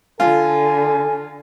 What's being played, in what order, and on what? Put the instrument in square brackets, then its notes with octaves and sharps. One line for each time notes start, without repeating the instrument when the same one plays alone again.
[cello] D3 [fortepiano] F4 [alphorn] A4 [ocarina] G#5